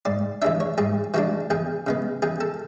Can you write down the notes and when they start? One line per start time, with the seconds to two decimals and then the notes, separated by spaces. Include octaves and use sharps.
0.05 G#2 D5
0.42 E3 G#3 D4 E5
0.60 C#5
0.78 G#2 G#4
1.14 E3 G#3 D4 F#4
1.50 E2 G#4
1.87 C#3 G#3 B3
2.22 E2 G#4
2.41 A4